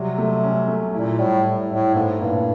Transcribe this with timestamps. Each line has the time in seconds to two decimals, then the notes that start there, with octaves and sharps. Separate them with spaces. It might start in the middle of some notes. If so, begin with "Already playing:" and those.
Already playing: C3 F#3 G3
0.18 A3
0.43 C#4
0.68 A3
0.94 A#2 E4
1.19 A2 G3
1.45 E4
1.70 A2 E4
1.95 G#2 A3
2.21 G2 A#2